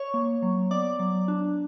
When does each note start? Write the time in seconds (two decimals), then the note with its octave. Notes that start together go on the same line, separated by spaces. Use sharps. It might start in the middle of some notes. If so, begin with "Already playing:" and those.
Already playing: C#5 C#6
0.14 A#3
0.42 F#3
0.71 B3 D5 D6
0.99 F#3
1.28 D4